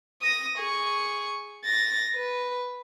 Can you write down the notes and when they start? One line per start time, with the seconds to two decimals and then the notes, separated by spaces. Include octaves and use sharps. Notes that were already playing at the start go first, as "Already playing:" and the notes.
0.22 D#6 A#6
0.58 G#4 C#6
1.65 A6 A#6
2.15 B4